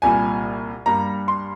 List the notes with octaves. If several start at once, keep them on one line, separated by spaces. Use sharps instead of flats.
C2 A#2 G3 G#5
G2 G3 A#3 A#5
C6